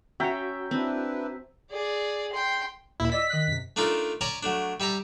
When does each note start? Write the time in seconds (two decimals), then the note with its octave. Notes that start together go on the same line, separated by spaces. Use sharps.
0.20 C#4 F#4 C#5 E5 G5 A#5
0.71 C4 D4 E4 B4
1.71 G#4 D5
2.33 G5 C6
3.00 D#2 A#2 E4
3.12 D5 D#5 E6 B6
3.30 D#3 D#5 F#6
3.47 F#2 C3
3.76 A3 D4 D#4 F4 A4 A#4
4.21 C#4 C#5 D5 A5 A#5
4.43 F#3 A3 D4
4.80 G3 E5 A5 A#5